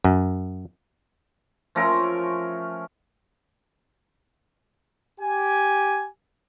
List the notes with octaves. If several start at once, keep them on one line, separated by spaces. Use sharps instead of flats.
F#2
F3 A3 C#4 A#4
G4 G#5